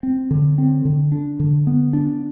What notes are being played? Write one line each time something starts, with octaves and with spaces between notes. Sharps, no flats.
C4
D3
C4
D3
D4
D3
B3
D4